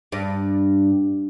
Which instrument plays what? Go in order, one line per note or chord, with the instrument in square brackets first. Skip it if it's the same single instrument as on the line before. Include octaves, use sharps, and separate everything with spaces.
[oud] G2